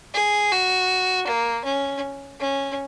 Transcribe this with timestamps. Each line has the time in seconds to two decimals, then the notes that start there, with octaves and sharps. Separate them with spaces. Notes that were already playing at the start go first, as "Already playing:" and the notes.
0.14 G#4
0.51 F#4
1.27 A#3
1.65 C#4
2.40 C#4